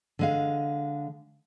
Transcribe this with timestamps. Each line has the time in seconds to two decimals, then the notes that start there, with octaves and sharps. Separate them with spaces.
0.19 D3 G#3 F5